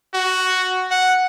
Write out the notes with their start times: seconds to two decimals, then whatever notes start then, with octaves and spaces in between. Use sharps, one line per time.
0.14 F#4
0.91 F#5